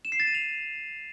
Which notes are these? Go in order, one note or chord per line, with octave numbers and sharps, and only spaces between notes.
E7
C7
A6
D#7
F7